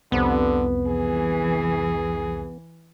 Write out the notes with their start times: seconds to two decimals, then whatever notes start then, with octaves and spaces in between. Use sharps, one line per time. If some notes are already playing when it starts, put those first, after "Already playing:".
0.12 C2 F2 D3 B3
0.87 E3 G#4